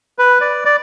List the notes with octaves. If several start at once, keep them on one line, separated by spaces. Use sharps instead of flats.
B4
D5
D5